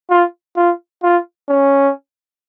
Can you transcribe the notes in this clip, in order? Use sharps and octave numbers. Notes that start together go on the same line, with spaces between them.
F4
F4
F4
C#4